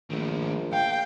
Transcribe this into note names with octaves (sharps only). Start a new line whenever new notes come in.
A#1 D#3 A3
F5 G5